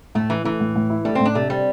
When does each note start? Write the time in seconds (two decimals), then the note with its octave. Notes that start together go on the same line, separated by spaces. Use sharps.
0.15 A2 A3
0.30 E3 E4
0.45 E3 A3
0.60 A2
0.76 A2
0.90 E4
1.05 G3 A3
1.15 A2 C4
1.25 D4
1.35 C3 A3
1.50 G3 C4